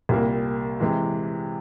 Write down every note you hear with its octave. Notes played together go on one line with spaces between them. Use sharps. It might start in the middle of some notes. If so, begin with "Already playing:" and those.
C2 A#2 G3 A#3
C3 E3 G#3